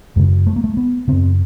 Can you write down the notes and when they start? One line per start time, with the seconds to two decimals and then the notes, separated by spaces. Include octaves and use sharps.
0.16 F#2 C#3 G#3
0.47 A3
0.56 A#3
0.64 A3
0.77 B3
1.07 F#2 C#3 C4